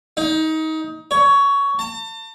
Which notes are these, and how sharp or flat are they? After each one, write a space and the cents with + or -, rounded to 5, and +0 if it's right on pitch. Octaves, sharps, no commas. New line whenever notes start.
D#4 +25
C#5 +15
A5 +40